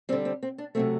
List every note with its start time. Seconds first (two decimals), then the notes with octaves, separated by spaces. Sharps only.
0.09 G3 C4
0.12 D3
0.25 C4
0.43 C4
0.58 D4
0.75 C3 F#3 A3 C4